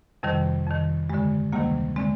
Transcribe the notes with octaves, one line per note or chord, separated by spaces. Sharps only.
F2 C3 D#3 G3
F2 D#3
G2 D3 G#3
D2 C3 D#3 G3 A#3
D3 G#3 C4